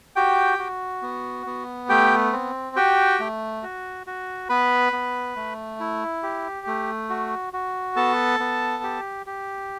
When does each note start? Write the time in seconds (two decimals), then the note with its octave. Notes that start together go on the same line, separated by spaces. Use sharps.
0.16 F#4 G4 G5
0.59 F#4
1.02 B3
1.47 B3
1.89 A3 G4 G5
2.33 C4
2.76 F#4 G4 G5
3.20 A3
3.63 F#4
4.07 F#4
4.49 B3 B4 B5
4.93 B3
5.36 A3
5.80 E4
6.23 G4
6.67 A3
7.10 F#4
7.53 F#4
7.96 B3 A4 A5
8.40 B3
8.83 G4
9.26 G4